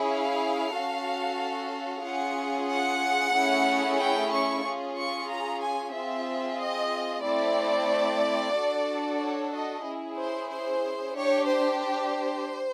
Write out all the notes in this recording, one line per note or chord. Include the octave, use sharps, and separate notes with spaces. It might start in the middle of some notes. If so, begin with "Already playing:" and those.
Already playing: C#4 E4 G#4
F5
C#4 F#4 A4
C#4 F4 G#4 F#5
F#5
A3 C#4 E4 G#4
G5
C#6
C#4 F4 G#4
C#6
A#5
G#5
C4 F4 G#4 E5
D#5
A3 C4 E4 D5
D4 F#4 A4
C#5
D#5
C#4 E4 G#4
C5
C5
D4 G4 C#5
C5
C5